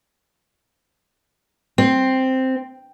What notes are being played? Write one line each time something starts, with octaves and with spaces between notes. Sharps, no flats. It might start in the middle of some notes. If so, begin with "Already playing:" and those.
C4